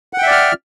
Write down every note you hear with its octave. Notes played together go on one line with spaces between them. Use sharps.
D5 E5 F#5 G5 F6